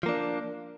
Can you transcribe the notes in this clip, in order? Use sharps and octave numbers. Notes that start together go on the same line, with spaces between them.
F3 A#3 D4